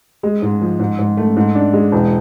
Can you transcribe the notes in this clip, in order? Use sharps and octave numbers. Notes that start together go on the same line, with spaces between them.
G#3
G#2
F3
G#2
G#2
A3
G#2
D4
G#3
E1